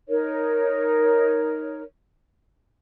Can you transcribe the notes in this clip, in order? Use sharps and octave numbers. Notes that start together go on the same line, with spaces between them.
D#4 A#4 C#5